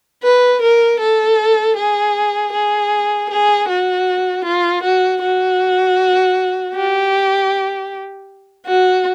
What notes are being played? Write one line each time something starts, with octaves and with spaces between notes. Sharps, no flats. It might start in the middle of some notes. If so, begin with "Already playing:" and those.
B4
A#4
A4
G#4
G#4
G#4
F#4
F4
F#4
F#4
G4
F#4